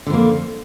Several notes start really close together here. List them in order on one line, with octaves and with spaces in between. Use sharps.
D3 F2 A#3